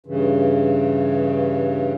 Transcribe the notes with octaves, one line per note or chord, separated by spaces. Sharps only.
G2 C#3 E3